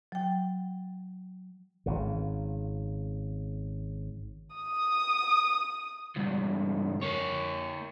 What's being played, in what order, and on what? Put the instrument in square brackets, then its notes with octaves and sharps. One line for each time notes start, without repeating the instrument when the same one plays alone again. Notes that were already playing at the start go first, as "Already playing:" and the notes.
[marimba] F#3 G5
[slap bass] G#1 C#3
[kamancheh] D#6
[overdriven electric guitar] C#2 G2
A#3 C#5